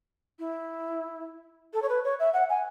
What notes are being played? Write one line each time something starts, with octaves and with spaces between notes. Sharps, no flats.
E4
A4
C#5
B4
C#5
E5
F#5
G#5